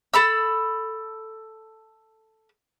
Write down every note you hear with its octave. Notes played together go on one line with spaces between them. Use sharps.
A4 B5 E6